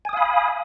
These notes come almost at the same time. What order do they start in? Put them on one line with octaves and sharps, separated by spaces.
G#5 D#6 F5 B5